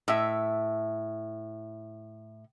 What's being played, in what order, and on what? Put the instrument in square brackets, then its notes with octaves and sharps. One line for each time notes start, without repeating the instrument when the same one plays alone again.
[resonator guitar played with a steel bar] A2 E5